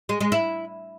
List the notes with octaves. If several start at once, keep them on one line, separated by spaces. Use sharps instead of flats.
G#3
G#3
E4